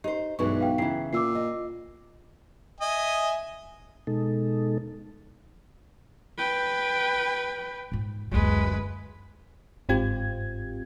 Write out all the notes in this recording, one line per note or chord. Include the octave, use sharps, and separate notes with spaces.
D#4 G4 C5
B1 G2 E3 G#3 C#6
F5 G5
C#3 E3 E4 G5 C7
A#2 D6 E6 C7
D#5
D#5 E5 G#5
B2 G#3 D#4 A4
B4 G5
G#2 F4
F#1 D2 G#3 B4
G1 G#2 C4 F4 G4 G#6